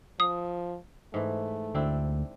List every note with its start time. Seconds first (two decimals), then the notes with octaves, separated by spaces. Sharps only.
0.20 F3 D#6
1.14 G#2 E3 A3
1.75 D2 C4 D4 E4